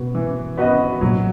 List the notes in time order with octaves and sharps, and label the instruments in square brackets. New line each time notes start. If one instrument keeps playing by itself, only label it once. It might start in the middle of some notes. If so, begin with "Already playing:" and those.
Already playing: [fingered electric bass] B2 [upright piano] B3 F#4
[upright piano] E3
B3 F#4 B4 D#5
[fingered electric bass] A#2 [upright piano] F#3